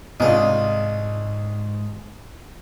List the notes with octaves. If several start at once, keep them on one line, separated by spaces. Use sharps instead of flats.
C2 G#2 D4 D#4 F4 G#4